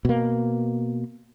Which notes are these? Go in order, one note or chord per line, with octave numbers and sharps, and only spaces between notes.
B2 A#3